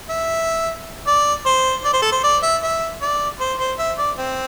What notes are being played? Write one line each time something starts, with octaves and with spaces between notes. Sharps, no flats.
E5
D5
C5
D5
C5
A4
C5
D5
E5
E5
D5
C5
C5
E5
D5
C4